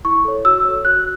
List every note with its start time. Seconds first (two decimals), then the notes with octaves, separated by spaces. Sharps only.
0.05 E4 C#6
0.25 A4 C#5
0.45 F#4 E6
0.65 A4 C#5
0.85 F#4 F#6